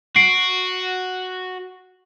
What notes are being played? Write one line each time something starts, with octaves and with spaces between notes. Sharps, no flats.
F#4 C7 D7